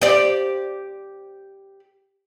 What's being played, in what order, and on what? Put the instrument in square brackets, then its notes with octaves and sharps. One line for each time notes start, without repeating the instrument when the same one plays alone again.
[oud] G4 C5 D5